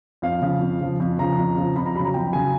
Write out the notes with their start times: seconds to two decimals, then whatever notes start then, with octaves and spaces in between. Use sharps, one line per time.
0.22 F2 F5
0.42 C#3 F3
0.61 F2
0.81 C#3 F3
1.00 F2
1.19 C#3 F3 A#5
1.38 F2
1.57 C#3 F3
1.76 F2 B5
1.86 A#5
1.95 F#3 B5
2.00 C#3 A#5
2.14 F2 G5
2.33 C#3 F#3 G#5